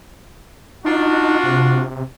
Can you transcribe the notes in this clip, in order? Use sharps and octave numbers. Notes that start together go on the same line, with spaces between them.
D4 D#4 F4 F#4
C3